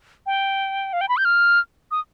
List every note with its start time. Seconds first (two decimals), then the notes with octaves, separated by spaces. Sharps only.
0.26 G5
0.93 F5
1.01 G5
1.09 B5
1.17 G6
1.25 F6
1.91 D#6